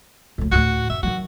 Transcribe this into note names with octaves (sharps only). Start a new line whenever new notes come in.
D2 A2
D2 A2 F#4
F#2 E5
D#3 F#3 F#4